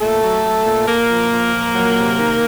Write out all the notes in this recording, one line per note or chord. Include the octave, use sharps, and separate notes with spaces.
A#2 A3 A4
F#3
F#3
A#2
A#2 A#3 A#4
F3
F3
A#2
F#3
C3
D#3